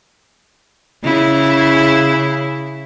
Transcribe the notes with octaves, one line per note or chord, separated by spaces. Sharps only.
C#3 E4